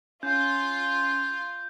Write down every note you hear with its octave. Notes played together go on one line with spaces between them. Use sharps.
C#4 F4 G6